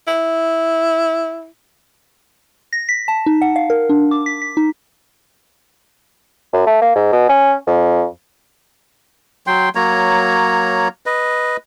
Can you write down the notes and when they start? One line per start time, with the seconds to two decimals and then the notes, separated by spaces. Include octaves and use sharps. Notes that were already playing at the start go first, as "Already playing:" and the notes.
0.08 E4
2.73 A#6
2.89 B6
3.08 A5
3.26 D#4
3.42 F#5
3.56 F5
3.70 A#4
3.89 D4
4.11 D6
4.26 B6
4.42 B6
4.57 D#4
6.53 F#2
6.67 A3
6.81 A#3
6.96 G#2
7.13 B2
7.29 C#4
7.67 F2
9.47 F#3 G5 C6
9.75 F#3 A#3 C#5 A#5
11.06 B4 D#5